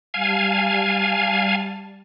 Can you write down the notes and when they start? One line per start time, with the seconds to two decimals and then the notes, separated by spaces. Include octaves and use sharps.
0.14 G3 F5 G#5 A5